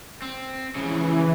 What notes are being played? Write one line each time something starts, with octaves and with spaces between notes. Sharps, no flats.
C4
C#3 E3 F3